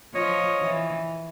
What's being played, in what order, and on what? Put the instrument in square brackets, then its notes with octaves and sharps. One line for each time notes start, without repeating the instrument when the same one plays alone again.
[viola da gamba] F3 [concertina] C#5 D#5
[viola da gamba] E3